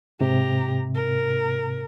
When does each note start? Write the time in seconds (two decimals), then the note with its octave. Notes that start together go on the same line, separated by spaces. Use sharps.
0.21 G#2 C3 G4 A#5
0.96 A#4